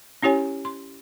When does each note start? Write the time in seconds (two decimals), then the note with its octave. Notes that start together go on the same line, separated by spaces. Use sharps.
0.23 C#4 E4 G4 C#5 G#5
0.65 C6